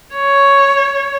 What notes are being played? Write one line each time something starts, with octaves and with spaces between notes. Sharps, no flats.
C#5